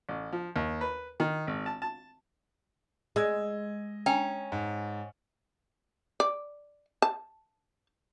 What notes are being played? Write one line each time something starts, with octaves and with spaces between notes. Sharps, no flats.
A1
F3
D#2
B4
D#3
G#1
A5
A5
G#3 D#5 E6 G#6
C#4 G5 A#5
G#2
D5
A5